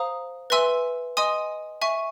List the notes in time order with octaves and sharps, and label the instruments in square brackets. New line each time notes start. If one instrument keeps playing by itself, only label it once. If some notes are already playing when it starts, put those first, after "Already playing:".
Already playing: [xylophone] C5 F5 A#5 D#6
B4 E5 G#5 C6 E6
D#5 G#5 C6 D#6
E5 G#5 C#6